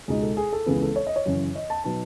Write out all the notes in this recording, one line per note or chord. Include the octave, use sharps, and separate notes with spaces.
C#2 B2 G#3 D#4 G#4
A4
G#4
A4
C#2 C#3 E3 B3 G#4
A4
C#5
D#5
C#5
F#2 C#3 E3
D#5
A5
B2 F#3 B3 D#4 A5